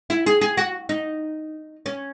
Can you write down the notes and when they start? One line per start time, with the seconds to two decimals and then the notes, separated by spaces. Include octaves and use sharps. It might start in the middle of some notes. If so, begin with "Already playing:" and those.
0.10 E4
0.26 G#4
0.41 G#4
0.57 F#4
0.89 D#4
1.86 C#4